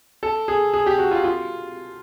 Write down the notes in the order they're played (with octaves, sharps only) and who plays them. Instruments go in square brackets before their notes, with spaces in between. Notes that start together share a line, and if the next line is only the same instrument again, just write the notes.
[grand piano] A4
G#4
G#4
G4
F#4
F4
F4